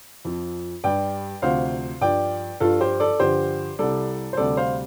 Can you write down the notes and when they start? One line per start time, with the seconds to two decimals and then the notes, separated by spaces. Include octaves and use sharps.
0.25 F2 F3
0.84 G2 G3 D5 G5
1.42 D2 C3 F3 C5 F5
2.01 G2 F3 D5 G5
2.60 G2 F3 F4 A4
2.81 G4 C5
3.00 A4 D5
3.20 G2 D3 F3 G4 C5
3.79 C2 C3 G3 A4 D5
4.33 C5
4.37 D2 C3 G3 A4 D5
4.57 C5 F5